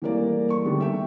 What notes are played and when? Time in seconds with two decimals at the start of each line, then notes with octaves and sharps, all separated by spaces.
0.02 E3 G3 A3 A#3 A#4 D5
0.50 C#6
0.65 D3 D#3 G3 A3 B3
0.81 E5 G5